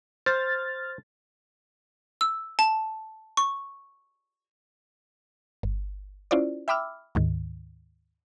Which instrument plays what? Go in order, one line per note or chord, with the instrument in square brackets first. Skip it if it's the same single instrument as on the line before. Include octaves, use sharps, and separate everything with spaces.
[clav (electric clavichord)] C5 [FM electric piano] F6 A6
[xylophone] E6
A5
C#6
[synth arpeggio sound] G1
C#4 E4 F4 C5 D5
E5 G5 B5 D6 E6 F6
D2 G#2 D#3